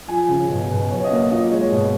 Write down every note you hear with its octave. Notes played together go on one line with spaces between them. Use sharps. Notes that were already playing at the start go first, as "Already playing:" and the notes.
F3 G#5
C#3
B2
B2
F#3 C#5
D#5
A#3
D#5
A#2 D#5
G#3 C#5
B2